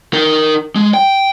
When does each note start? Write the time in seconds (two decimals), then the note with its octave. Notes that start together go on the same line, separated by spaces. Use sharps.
0.13 D#4 A#4
0.75 G#3
0.94 G5